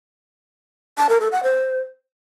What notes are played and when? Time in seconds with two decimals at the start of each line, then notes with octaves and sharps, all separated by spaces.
0.98 A5
1.09 A#4
1.20 A4
1.32 F#5
1.43 C5